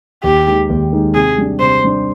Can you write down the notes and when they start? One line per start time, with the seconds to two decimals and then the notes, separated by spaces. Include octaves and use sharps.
0.24 D#2 G4
0.46 D#3 G#3 D#4
0.70 D#2
0.92 D#3 G#3 D#4
1.15 C3 G#4
1.38 G3 D4
1.60 C3 C5
1.84 G3 D4